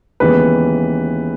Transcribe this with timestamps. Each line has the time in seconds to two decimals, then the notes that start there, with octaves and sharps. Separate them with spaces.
0.20 D#2 C#3 E3 G#3 B3 B4